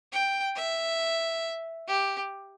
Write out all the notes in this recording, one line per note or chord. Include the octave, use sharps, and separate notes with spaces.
G5
E5
G4